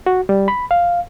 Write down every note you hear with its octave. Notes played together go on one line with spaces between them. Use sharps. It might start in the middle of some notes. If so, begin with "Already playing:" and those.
F#4
G3
B5
F5